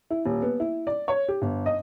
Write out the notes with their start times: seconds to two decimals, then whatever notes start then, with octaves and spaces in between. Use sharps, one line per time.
0.11 E4
0.26 D#1
0.42 B3
0.60 E4
0.87 D5
1.08 C#5
1.29 G4
1.42 G1
1.66 D#5